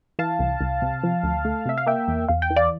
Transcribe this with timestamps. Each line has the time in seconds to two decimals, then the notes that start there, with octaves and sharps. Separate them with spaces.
0.19 E3 F5 A5
0.39 C2
0.61 C2
0.82 C3
1.03 F3
1.23 D2
1.45 A3
1.66 C3 E5
1.78 F5
1.86 A#3 E5 G5
2.08 E2
2.29 E2 F5
2.42 G5
2.50 E3
2.56 D5 F5